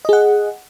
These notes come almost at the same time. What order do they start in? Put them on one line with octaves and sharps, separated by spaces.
D#5 G#4 F#5